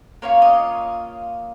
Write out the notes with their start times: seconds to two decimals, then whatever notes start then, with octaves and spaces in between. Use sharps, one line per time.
0.22 A#3 C#4 F4 C#5
0.42 D#5